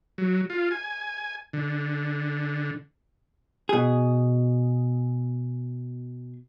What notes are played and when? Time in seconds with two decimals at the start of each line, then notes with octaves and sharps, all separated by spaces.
0.18 F#3
0.50 F4
0.71 G#5
1.53 D3
3.69 B2 G#4